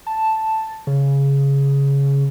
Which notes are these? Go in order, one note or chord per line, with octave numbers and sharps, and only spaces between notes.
A5
C#3